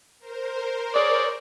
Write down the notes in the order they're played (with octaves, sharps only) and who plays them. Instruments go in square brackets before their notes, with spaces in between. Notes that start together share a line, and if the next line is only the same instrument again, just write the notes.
[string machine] A#4 C5
[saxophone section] G#4 C#5 D5